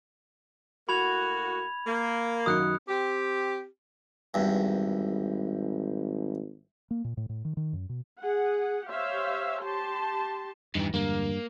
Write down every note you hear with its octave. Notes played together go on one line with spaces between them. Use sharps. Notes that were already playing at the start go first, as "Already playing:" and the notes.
A2 A#3 F#4 B5 G#6 F7
A#3
F#2 D#3 F#3 D#6 F#6 C#7
C4 G4
G#1 E2 G2
A#3
A#2
A2
A2
D#3
D#3
F#2
B2
G#4 F#5
G4 C5 C#5 E5 F5
G4 A5 C6
E2 G2 D#3 E3
E2 G2 D3 G#3 A#3